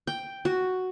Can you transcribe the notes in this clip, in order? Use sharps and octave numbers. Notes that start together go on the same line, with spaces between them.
G5
F#4